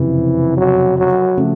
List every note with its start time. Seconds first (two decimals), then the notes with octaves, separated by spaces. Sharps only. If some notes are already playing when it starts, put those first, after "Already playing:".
Already playing: F#1 F2 C3 E3
0.57 F#3
0.97 F#3
1.37 C#3 F3 A3